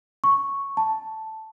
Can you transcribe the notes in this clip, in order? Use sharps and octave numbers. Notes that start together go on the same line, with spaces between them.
C#6
A5